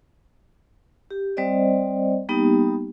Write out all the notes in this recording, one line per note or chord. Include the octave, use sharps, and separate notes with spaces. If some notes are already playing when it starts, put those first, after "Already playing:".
G4
G3 C4 C5 D5 D#5
G3 A#3 B3 D#4 G4